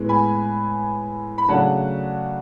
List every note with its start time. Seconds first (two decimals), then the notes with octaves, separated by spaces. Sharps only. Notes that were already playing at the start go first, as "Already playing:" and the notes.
Already playing: A2 G#3 B3
0.09 G#5 B5
1.38 B5
1.48 C#3 F#3 A3 D4 F#5 A5